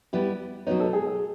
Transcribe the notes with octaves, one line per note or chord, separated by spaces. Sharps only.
G3 B3 E4 G4
B2 F#3 B3 D#4 C#5
A4
G#4
G#4